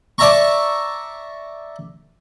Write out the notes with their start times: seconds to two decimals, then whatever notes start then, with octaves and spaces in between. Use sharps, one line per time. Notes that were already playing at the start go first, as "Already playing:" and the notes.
0.18 D5 E5 A5 A#5 C#6